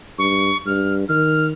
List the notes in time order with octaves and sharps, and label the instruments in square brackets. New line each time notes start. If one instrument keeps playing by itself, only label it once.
[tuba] G2 [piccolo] C#6
[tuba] G2 [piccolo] F6
[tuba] D#3 [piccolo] F6